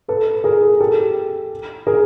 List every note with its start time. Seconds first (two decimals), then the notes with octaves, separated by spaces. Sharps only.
0.08 A4 B4
0.44 G#4 A#4
0.80 G4 A4
1.87 G#4 A#4